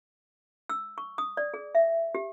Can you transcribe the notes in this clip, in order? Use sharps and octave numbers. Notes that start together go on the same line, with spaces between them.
E6
C#6
D#6
D5
G#4
E5
G4